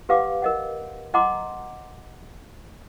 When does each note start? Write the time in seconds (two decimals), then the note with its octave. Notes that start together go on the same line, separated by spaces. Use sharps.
0.09 G4 B4 F5 F#5 D6
0.42 A#4 D#5 F#5
1.14 D#5 F#5 A#5 C6 D6